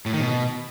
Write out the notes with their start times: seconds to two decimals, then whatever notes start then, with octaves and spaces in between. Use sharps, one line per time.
0.06 A2
0.13 D#3
0.21 B2